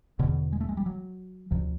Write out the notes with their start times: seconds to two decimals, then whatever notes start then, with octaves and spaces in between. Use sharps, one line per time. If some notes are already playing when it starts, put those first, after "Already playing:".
0.19 E2 B2 D3
0.52 G#3
0.61 A3
0.69 G#3
0.77 G3
0.86 F#3
1.51 D2 C3 F3